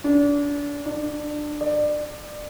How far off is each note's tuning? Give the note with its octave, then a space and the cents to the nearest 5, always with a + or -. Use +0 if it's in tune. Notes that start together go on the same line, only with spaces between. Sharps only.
D4 -30
D4 +20
D5 +25